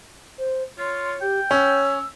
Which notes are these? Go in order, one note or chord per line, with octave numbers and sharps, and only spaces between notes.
C5
F4 C#5 C6
G4 G5
C#4 C#5 E6